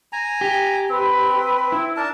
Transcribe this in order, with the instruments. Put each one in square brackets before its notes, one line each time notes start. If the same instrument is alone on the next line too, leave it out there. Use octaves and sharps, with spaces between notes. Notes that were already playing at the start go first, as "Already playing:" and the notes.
[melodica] G#5 A#5
[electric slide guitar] G4
[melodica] C4 [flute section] B4
[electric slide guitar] E4
[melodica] D4 A#4 A5